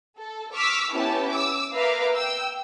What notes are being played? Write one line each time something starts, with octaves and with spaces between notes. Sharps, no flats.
A4
C#6 D6 E6 F6 B6
B3 C#4 E4 G4 A5
D6 E6
A#3 B4 E5 F5 A#5 D6
G5 E6